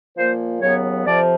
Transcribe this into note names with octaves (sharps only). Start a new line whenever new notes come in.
A#2 F3 A#3 C5
D#2 C#3 F#3 B3 C#5
F2 C3 F3 D5